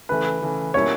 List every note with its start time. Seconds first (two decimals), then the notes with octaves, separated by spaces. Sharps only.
0.09 C#3 E3 A3 B4
0.42 C#3 E3 A3
0.74 B2 G3 A#3 C#4 E4 C#5